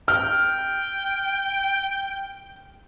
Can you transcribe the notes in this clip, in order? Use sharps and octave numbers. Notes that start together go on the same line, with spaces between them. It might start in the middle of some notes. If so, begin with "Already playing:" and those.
G5 F6